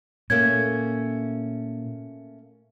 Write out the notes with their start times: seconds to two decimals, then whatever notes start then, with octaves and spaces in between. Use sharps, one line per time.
0.30 A#2 A3 A#3 C#4 G#6